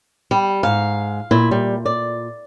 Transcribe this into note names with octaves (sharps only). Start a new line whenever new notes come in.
G3
G#2 F5
A#2 E4
G3
D5